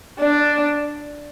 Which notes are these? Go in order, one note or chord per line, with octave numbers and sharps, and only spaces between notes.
D4